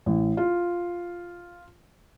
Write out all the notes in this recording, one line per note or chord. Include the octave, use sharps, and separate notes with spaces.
A1
F4